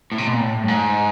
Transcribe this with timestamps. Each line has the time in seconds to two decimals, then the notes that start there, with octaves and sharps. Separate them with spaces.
0.12 A2
0.18 C3
0.26 B2
0.33 A#2
0.40 A2
0.63 G2
0.68 G#2